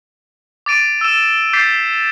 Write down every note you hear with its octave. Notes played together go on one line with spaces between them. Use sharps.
D6 A6 D7 D#7
E6 E7
D6 G6 A6 B6 C7